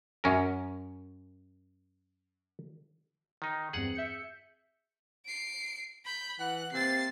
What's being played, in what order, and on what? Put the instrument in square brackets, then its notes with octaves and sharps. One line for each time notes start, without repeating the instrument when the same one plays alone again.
[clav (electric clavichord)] F#2 C#4 A#4
D#3 D#4
[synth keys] E2 G2 C4 [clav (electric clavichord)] G#4 F#5
[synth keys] E5 G6 C#7
[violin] C7 D7
B5 G6
[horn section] E3 F#5 [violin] F#6
[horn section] C3 A#3 C4 [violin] A6 C7